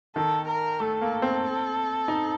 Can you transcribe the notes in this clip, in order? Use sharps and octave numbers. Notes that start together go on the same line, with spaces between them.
D#3 A4
A#4
A3 A4
A#3
C4
D#4